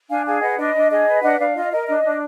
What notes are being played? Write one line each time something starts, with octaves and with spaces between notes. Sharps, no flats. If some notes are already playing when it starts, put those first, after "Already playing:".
D4 F5 G#5
G#4 F5 G#5
B4 D#5 F#5
D4 D#5
D4
G#4 D#5
B4
D4 D#5 F#5
D4 D5 F5
F4 D#5
A#4 D#5
D4 D#5
D4